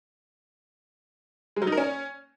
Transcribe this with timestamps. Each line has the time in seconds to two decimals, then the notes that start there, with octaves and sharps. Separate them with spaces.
1.56 G#3
1.62 F#3
1.67 D#4
1.72 A#4
1.78 C#4